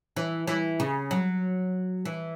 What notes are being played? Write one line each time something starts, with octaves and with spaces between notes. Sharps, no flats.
E3
E3
C#3
F#3
E3